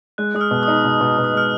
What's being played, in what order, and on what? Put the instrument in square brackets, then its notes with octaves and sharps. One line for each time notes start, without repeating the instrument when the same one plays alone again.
[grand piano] G#3 [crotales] F#6
[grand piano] G#3 [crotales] D#6
[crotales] F6
[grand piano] B2
[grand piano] D#4 [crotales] D#6
[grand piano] B2
B2
B2
[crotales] D#6
[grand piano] G#3 [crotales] F6